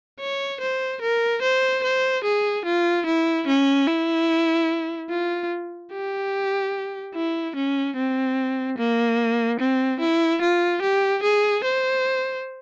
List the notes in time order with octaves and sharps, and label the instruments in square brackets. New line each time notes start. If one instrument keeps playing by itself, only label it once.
[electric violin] C#5
C5
A#4
C5
C5
G#4
F4
E4
C#4
E4
F4
G4
E4
C#4
C4
A#3
C4
E4
F4
G4
G#4
C5